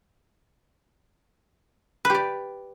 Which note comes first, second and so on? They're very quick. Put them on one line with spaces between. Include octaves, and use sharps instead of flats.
B4 G4 D5